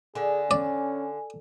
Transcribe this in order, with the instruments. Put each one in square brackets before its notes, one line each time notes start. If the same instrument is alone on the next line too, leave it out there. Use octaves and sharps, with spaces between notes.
[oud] D3 [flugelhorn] G#4 [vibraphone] G#5
[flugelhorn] C#4 [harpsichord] D5